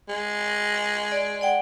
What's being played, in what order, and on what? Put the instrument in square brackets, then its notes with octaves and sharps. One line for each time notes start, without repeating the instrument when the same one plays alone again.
[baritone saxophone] G#3
[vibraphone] D5
D5 F#5 G5